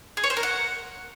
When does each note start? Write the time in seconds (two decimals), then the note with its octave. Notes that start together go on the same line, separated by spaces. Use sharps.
0.17 G#4
0.24 C#5
0.30 C5
0.37 A#4
0.43 F#5